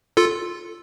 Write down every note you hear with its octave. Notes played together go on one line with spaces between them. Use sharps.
F4 A4